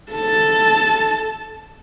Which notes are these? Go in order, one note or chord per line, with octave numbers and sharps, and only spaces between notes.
A4 A5